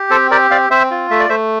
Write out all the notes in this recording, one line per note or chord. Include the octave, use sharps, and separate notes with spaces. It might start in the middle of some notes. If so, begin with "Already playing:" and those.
Already playing: G4
C4 A4 C5
G4 A#4 D5
C4 D5 F5
C4 C5 E5
F4
A3 E5
D5
A3 C5 E5